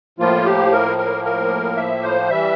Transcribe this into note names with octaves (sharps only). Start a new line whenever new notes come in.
A2 F3 A#3 F4
G4
A#4
A#4
A#4
E5
C5
E3 G3 E5